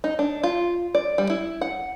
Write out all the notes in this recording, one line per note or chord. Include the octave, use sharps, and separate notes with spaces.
D#4
D4
F4
D5
G3
E4
F#5